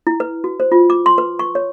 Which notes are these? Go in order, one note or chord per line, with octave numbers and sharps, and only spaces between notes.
E4
B4
F#4
C5
F4
D6
C6
B4
C#6
C#5